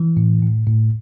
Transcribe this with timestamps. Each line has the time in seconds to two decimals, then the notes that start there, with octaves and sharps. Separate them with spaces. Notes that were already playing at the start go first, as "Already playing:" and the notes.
Already playing: E3
0.17 A2
0.43 A2
0.67 A2